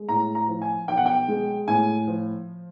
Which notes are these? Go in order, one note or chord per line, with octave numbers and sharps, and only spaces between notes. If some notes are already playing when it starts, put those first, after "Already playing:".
Already playing: G#3
A2 A#5
A#5
F3
G#5
B1 G5
F#5
G5
G#3
A2 G#5
F3